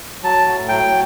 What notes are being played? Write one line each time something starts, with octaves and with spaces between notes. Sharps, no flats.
F#3 A5
A2
F#3 G5